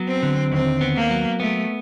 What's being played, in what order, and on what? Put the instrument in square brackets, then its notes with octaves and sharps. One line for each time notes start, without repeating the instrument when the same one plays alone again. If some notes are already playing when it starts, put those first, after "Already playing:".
Already playing: [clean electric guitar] F#3 B3
[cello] C4
[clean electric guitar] D3
[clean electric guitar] D#2 [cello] C4
[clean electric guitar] B3
[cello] A#3
[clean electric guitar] F#3
[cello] A3 [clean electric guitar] B3